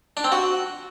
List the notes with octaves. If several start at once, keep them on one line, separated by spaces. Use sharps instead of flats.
D4
C4
F#4